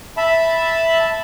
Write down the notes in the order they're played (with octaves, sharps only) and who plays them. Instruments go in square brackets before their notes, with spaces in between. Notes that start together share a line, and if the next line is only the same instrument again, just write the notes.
[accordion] E5 A5 B5